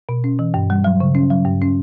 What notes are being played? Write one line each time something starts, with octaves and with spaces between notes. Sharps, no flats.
B2
C#4
E3
G2
G3
F#3
C#3
C#4
F#3
G2
C#4